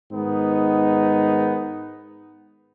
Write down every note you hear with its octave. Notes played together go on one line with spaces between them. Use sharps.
G#2 D#3 B3 D#4